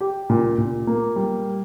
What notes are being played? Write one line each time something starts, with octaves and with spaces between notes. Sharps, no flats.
G4
A#2
A#2
A#3
G3